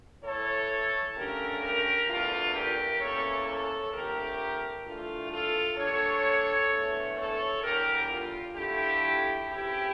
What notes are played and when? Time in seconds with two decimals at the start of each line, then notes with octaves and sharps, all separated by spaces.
0.24 A2 E3 A3 A4 C#5
1.16 G2 D3 A3 C#4 G4 A#4
1.62 G4 A#4
2.09 E2 E3 A3 D4 F4
2.55 G4 A#4
3.01 E2 E3 A#3 C#4 A4 C#5
3.47 A4 C#5
3.93 F2 D3 A3 G4 A#4
4.85 G2 E3 A3 D4 F4 A4
5.31 F4 A4
5.77 A#2 G3 D4 A4 C#5
6.70 E2 D3 A3
7.16 A4 C#5
7.62 E2 D3 G3 G4 A#4
8.09 F4
8.55 D3 F3 A3 E4 G4
9.47 F2 C#3 E3 E4 G4